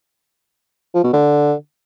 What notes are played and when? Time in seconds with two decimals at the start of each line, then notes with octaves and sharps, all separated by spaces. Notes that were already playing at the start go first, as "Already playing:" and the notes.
0.95 F3
1.04 B2
1.13 D3